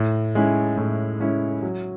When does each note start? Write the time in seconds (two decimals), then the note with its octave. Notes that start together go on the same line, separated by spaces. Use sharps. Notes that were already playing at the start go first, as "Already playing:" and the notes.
Already playing: A2
0.35 G#3 C#4 E4
0.78 A2
1.20 G#3 C#4 E4
1.62 F#3